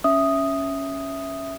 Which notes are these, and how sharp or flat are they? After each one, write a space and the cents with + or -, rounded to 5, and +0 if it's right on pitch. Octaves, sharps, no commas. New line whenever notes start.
C#4 +0 E5 +0 D#6 +0